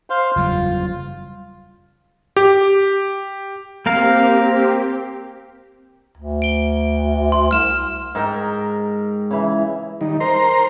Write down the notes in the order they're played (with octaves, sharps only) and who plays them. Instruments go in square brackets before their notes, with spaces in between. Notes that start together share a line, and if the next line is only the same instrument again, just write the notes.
[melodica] C5 F5 C6
[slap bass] F#1 E2 G3 [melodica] F4
[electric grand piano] G4
[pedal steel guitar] A#3 A#4 F5 [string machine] C4 G4
[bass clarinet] D2
[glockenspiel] D7 G7
C6
[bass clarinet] C2 [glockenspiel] F6 E7
[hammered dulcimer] G#2 A#4 G5
C#3 E3
[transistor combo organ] D#3 G3 D#4
A#4 C5 A#5 C6